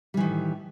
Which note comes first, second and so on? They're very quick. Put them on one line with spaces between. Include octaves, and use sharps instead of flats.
G3 E3 D#3 A2